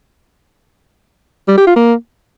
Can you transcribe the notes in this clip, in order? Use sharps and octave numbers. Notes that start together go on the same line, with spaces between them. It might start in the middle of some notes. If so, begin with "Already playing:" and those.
G3
G4
F4
A#3